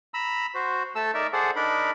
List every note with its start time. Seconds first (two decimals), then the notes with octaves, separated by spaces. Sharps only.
0.14 A#5 B5 E6
0.55 F#4 C5
0.95 A3 A4 A5 E6
1.14 D#4 A#4 D5 E5
1.33 G#4 A4 C5 D5 F#5
1.56 D4 D#4 A#4 B5